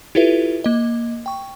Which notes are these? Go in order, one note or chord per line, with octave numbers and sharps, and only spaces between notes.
E4 F4 G4 A4 B4 E5
A#3 D#5
G5 C#6